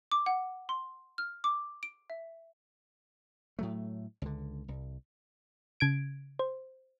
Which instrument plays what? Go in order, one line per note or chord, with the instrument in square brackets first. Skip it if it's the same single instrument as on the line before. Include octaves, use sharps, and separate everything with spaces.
[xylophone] D6
F#5
C6
F6
D6
D7
E5
[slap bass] A2 F#3 A3
C#2 D3
C2
[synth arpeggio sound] C#3 G#6 D7
C5